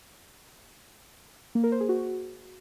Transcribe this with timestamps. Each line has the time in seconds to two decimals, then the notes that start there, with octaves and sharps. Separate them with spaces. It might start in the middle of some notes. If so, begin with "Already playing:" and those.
1.55 A#3
1.64 A#4
1.72 C5
1.80 G#4
1.89 F#4